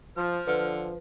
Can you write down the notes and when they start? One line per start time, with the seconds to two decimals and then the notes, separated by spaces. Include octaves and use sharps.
0.17 F3 C5 F6
0.47 D3 F3 B4